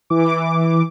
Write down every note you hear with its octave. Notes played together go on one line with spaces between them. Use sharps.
E3 D6